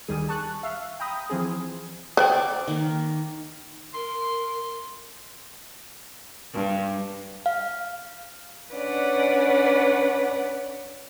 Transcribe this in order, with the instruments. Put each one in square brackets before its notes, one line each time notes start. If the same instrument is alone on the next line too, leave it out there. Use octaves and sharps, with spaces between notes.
[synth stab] D2 D#3 G3 G#4 D#7
A5 C#6 F#6
E5 F5
G5 A#5 B5 D#6
E3 F3 C4 G#4
[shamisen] B4 C5 G5 [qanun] D5 C#6
[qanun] D6
D#3 A#3
[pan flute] A#4 [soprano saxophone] C6
[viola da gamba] G2
[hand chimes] F5
[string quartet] C#4 D4 B4 C#5 D5 F#5